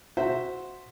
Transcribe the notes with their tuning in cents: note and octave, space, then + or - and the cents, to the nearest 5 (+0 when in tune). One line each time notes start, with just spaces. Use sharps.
F#4 -10 C5 +0 E5 +0